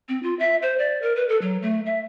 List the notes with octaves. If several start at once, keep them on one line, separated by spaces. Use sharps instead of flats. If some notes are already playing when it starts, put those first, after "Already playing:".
C4
F4
E5
C5
D5
A#4
B4
A4
F#3
A3
E5